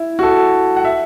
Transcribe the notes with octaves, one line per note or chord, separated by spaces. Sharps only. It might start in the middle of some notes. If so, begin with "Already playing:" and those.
Already playing: E4
F#4
A4
F#5
E5